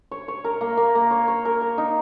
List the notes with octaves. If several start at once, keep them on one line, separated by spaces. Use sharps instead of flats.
C#5
C#5
A#4
A#3
A#3
A#3
C#5
C#5
A#4
A#4
D#4